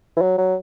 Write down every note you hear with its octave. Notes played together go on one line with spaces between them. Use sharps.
E3
F#3
F#3